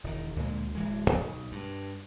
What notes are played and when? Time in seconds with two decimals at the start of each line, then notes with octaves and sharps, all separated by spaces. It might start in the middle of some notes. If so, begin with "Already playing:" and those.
0.04 E1 D#3
0.36 D2 A#2 D3 G#3
0.75 D1 E3 G#3
1.11 B1
1.52 G2